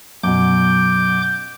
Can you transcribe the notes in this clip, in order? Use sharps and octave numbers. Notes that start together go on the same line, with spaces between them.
F#2 B2 D6 G6